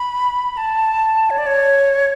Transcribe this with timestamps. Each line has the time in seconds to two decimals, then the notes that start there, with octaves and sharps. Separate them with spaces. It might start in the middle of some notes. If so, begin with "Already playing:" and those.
Already playing: B5
0.57 A5
1.30 C#5
1.38 D5
1.47 C#5